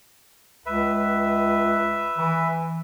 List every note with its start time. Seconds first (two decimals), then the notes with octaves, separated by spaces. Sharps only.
0.66 C#2 B4 E5
2.18 E3